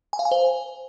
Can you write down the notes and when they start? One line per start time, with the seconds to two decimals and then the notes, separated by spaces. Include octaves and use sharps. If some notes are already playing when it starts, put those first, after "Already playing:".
0.13 G#5
0.19 F5
0.25 G#5
0.31 C5